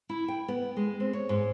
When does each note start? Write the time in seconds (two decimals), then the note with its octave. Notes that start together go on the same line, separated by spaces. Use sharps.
0.09 E4
0.28 G5
0.48 B3
0.76 G#3
1.00 C4
1.13 C#5
1.29 G#2